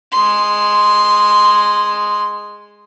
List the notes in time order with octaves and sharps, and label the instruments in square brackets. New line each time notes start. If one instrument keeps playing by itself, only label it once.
[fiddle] G#3 C6